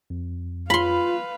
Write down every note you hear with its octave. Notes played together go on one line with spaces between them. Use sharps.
F2
F4 B4 F5 B5 C6